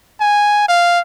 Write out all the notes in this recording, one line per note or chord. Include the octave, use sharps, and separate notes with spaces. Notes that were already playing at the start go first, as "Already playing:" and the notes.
G#5
F5